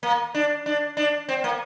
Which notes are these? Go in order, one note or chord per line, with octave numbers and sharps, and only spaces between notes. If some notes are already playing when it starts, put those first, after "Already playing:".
A#3
D4
D4
D4
C4
A#3